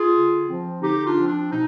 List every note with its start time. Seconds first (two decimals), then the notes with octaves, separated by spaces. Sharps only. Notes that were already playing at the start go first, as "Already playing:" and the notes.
Already playing: F4 G#4
0.12 D3
0.47 F3 C4
0.82 D3 D#4 G4
1.05 D4 F4
1.18 F3 C4
1.28 D4
1.52 B2 D#4